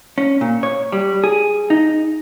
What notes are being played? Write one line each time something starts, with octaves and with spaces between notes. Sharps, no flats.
C#4
A#2
C#5
G3
G#4
D#4